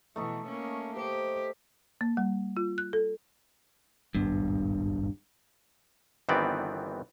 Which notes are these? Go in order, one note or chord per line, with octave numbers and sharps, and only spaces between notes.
B2 E3 A3 D#4 C#6
A#3 C#4
G4 C5
A#3
G3
F4
F#6
A4
D#1 G#1 G2 B3
G1 D#3 E3 B3 C4 D5